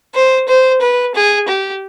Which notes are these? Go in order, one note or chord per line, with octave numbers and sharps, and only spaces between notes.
C5
C5
B4
G#4
G4